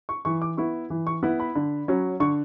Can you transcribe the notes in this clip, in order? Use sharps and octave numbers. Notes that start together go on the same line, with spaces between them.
C#6
E3 C#6
D6
B3 E4 C#6
E3
C#6
B3 E4 B5
B5
D3
F#3 C#4
D3 C#6